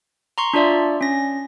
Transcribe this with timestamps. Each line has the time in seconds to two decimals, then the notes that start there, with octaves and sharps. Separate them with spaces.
0.38 A#5 C6 C#6
0.53 D4 F4 D5 E5
1.01 C#4 A#6